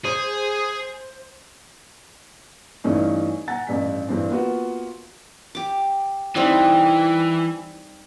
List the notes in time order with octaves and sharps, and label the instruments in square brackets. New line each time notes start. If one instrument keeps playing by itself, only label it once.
[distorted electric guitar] G#4 [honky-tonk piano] C5
[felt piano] G2 E3 A3 C#4 D#4
F#5 G#5 A#5 A6
A1 G2 B6
G2 E3 C4 D4
A#3 B3 F4 F#4
[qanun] G4 D6
[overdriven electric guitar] E3 [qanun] G3 C4 D#4